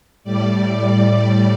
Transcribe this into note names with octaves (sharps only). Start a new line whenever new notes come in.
A2 G3 D5